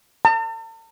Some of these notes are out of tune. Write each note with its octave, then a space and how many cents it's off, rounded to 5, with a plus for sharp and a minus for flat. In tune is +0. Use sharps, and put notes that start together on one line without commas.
A5 +45